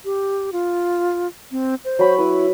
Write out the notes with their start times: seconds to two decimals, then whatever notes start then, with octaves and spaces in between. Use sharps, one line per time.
0.05 G4
0.53 F4
1.52 C4
1.85 C5
1.99 F#3 B5 C#6
2.18 E4 B4